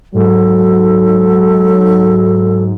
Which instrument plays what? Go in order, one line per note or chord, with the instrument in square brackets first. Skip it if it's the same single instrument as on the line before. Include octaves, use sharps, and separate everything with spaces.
[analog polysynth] G#2 [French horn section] F#3 [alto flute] A4